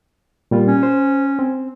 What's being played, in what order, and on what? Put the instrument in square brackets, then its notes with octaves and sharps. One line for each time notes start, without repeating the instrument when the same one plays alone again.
[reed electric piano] A#2 G3 F4
[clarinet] C#4
[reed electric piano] C5
C4